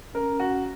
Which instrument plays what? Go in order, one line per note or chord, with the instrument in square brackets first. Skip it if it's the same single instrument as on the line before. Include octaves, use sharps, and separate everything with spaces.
[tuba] C#4 [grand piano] A#4
[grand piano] F#4